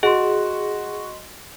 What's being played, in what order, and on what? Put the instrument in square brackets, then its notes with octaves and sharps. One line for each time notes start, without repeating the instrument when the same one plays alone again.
[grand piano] F#4 [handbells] G#4 [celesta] D#5 C6